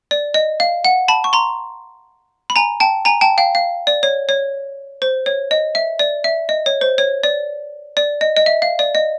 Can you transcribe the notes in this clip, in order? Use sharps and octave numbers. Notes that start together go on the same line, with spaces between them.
D5
D#5
F5
F#5
A5 B5
C#6
A#5 C6
B5
G#5 A#5
G5 A5
G#5 A#5
G5 A5
F5 G5
F5
D5
C#5
C#5
C5
C#5
D#5
E5
D5
E5
D#5
C#5
C5
C#5
D5
D5
D#5
D#5
E5
F5
D5
D#5